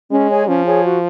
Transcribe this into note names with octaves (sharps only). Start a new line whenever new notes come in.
G#3 C#4
G#4 C#5 G#5
F3 C#4
G#4 C#5 G#5
F#4